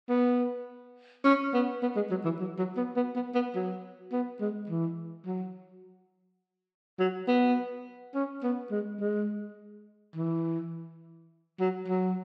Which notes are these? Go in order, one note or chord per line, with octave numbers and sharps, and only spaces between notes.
B3
C#4
B3
B3
G#3
F#3
E3
F#3
F#3
B3
B3
B3
B3
F#3
B3
G#3
E3
F#3
F#3
B3
C#4
B3
G#3
G#3
E3
F#3
F#3